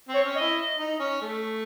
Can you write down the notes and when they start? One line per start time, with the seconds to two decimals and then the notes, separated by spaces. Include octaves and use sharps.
0.09 C4
0.14 C#5
0.24 C#4
0.35 D#5
0.41 E4
0.78 D#4
0.99 C#4
1.21 A3